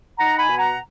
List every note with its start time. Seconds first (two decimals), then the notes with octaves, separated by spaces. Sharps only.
0.18 D#4 F#5 A#5
0.38 G#5 B5
0.48 B2
0.58 F#5 A#5